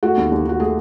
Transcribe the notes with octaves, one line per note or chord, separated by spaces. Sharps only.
A3 F#4
D#2
D#2
D#3 F#4
A3 G#4